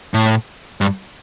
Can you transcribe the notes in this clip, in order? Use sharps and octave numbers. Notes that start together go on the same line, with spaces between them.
A2
G2